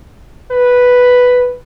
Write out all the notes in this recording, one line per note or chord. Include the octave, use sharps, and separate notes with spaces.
B4